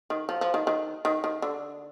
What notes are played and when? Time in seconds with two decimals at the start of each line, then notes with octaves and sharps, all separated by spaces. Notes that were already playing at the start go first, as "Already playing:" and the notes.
0.10 D#3
0.29 F3
0.41 F3
0.54 D#3
0.67 D#3
1.05 D#3
1.24 D#3
1.42 D3